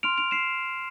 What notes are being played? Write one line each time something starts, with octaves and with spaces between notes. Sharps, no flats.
C6 F6 D7 F7
D7 F7
C7 E7